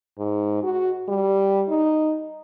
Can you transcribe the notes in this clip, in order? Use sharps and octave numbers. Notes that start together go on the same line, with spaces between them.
G#2
F#4
G3
D#4